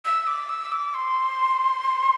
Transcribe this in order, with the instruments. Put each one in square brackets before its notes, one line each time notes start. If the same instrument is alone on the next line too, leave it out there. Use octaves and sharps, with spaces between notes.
[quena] E6
D6
E6
D6
C6